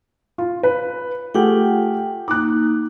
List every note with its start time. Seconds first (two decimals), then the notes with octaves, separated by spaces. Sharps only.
0.38 F4
0.63 B4
1.34 A3 F4 G4 G#4 F#5 G5
2.28 A#3 D#4 D6 F#6